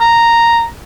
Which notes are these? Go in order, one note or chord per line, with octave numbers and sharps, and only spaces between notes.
A#5